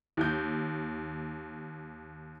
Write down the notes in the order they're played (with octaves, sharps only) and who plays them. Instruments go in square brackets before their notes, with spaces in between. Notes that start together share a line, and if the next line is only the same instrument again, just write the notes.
[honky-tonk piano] D#2 G6